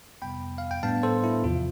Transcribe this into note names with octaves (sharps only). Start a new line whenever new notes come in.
F2 C3 G3 B3 G5 B5
F5
G5
A2 G3 B3 D4 F5 A5
A4 C5
E4
E2 C3 F3 F4